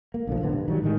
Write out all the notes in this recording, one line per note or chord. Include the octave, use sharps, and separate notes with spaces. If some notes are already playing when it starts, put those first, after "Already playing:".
A#3
B1 D3 F3
D1 B1 D3 B3
G2
D#3 F#3 G3
A2 D#3 G#3